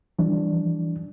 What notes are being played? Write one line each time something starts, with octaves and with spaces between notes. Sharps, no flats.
E3 F3 G3 D4